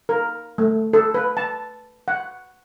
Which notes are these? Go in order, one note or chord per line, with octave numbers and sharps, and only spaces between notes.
A#4
A3
A4
B4
A5
F#5